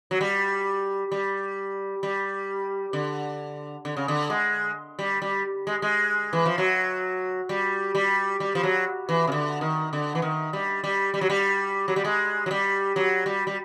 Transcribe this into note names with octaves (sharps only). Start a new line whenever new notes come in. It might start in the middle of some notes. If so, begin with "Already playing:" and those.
F#3
G3
G3
G3
D3
D3
C#3
D3
G#3
G3
G3
G#3
G#3
E3
F3
F#3
G3
G3
G3
F3
F#3
E3
C#3
D3
D#3
D3
E3
D#3
G3
G3
G3
F#3
G3
F#3
G3
G#3
F#3
G3
F#3
G3
G3